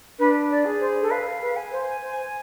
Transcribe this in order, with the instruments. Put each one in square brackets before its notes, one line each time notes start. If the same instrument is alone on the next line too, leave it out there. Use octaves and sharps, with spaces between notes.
[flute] D4 [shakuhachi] B4
[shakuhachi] D5
[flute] G#4
[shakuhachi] C5
A4
[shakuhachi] B4 [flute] F5
[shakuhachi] B4
[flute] G#5
[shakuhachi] C5
C5